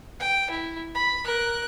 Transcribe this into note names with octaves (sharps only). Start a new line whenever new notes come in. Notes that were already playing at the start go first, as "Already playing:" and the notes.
G5
E4
B5
A#4 F#6